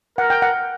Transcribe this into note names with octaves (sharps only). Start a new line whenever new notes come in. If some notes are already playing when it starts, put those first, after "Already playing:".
A#4 F#5
G5
F#5